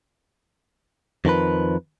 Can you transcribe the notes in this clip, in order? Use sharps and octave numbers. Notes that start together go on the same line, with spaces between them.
F2 D#3 F3 B4